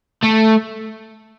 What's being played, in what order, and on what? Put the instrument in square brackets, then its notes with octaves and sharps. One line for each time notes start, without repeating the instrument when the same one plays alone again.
[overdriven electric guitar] A3